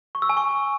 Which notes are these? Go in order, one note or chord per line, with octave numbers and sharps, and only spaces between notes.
C#6
E6
G#5
C#6